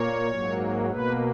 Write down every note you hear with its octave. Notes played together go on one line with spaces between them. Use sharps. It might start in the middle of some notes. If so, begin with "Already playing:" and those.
Already playing: A#2 A#3 C#5
G#2 F#3 A#3
B2 A#3 B4